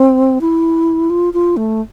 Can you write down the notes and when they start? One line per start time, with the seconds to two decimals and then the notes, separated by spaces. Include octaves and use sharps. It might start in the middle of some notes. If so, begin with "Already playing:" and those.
Already playing: C4
0.41 E4
1.10 F4
1.34 F4
1.57 A3